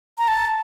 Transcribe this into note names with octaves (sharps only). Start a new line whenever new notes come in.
A#5
A5